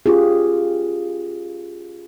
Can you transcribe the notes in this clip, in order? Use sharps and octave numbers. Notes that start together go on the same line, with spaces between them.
C#4 F4 G4 G#4